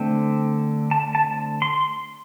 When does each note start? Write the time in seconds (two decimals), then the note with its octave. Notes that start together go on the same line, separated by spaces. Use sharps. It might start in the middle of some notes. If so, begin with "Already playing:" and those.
Already playing: D3 A3 C4
0.91 A5
1.15 A5
1.62 C6